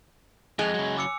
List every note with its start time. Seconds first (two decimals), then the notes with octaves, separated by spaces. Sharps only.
0.59 F2 G#3 G#5 F#6 F7
0.74 C#3 F#3
0.97 D6 E6 C#7